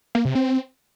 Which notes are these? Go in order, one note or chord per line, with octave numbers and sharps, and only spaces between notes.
A#3
C3
C4